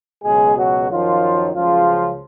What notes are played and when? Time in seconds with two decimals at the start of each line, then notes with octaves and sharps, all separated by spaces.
0.24 C#2 B2 F#3 G#3 G#4
0.56 F#3 F#4
0.89 F#2 D#3 F3 F#3 F4
1.53 C#2 C#3 F3 F#3 F4